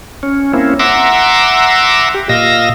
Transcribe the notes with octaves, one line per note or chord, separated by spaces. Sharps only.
C#4
A#3 C4 C#4 E4
E5 F#5 A#5 C6 D6 E6
G4
A#2 D#5 F5 E6 A#6